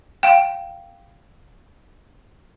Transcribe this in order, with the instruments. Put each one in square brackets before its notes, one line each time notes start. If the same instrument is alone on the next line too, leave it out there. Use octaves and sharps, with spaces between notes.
[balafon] F5 G5